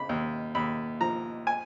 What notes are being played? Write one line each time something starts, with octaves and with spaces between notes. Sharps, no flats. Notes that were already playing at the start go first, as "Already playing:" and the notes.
Already playing: C#3 B5
D#2
D#2 B5
F3 A#5
G#5